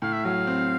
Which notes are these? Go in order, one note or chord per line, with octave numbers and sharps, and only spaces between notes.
A2 F5
E5
F#3 F5
C4